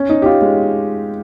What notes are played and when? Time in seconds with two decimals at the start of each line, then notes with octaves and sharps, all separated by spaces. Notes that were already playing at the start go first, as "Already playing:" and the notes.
Already playing: C#4
0.09 D#4
0.22 G4
0.26 F4
0.42 G#3